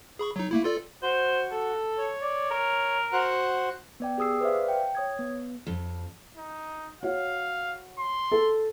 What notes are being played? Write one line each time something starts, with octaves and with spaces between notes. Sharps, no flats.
G#4 B5 C#6
F#3 D#4
A3 A#3 E4
F4 A4 D5
F#4 C5
A4
C#5
D5
A#4
F#4 C5 F#5
B3 D5 G5
G4 G#4 D#6 E6 C7
B4 C5 D5 E5 F5
G5
C#5 D#6 G#6
B3
F2
D#4
F#4 C#5 F5
C6
A4